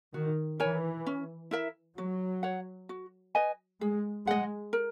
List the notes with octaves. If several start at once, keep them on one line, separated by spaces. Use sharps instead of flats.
D#3 F#4
E3 A#4 C#5 G#5
C#4
E4 A#4 E5
F#3 F#4
C#5 F#5
F#4
B4 D#5 G#5
G#3 G#4
G#3 D#5 F#5
A#4